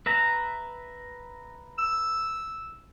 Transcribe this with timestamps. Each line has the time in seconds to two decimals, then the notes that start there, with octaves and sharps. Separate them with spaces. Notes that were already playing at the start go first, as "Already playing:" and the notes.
0.06 B4 E5 A#5
1.78 E6